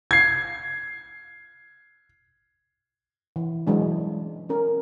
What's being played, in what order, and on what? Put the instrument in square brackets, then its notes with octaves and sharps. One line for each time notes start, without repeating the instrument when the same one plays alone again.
[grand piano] G#6 C7
[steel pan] E3
E3 F#3 G#3 D4
C#4 A#4